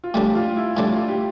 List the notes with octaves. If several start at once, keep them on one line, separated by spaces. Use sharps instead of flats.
F4
A2 G3 D4 G4
F4
E4
A2 G3 D4
F4
G4